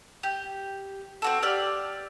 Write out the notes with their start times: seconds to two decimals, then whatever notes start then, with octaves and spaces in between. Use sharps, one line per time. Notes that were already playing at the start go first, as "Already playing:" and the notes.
0.23 G4
1.22 C4 F#4 A4
1.42 G4 D5 E6 F6